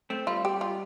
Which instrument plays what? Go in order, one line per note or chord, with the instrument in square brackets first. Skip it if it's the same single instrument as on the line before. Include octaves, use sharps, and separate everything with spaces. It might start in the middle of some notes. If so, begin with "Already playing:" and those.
[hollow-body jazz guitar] A3 C4
[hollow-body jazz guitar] G3 [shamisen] F4
[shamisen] G4
F4